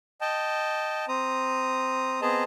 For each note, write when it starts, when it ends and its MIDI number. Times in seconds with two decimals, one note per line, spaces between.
0.21 1.05 75
0.21 1.05 79
0.21 1.05 81
1.08 2.21 60
1.08 2.21 82
1.08 2.21 87
2.22 2.44 59
2.22 2.44 60
2.22 2.44 68
2.22 2.44 75
2.22 2.44 81
2.22 2.44 82